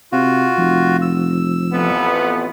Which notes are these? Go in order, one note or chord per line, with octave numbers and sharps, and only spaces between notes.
C3 F4 F#4
F1 F3
E6
A1 F2 B3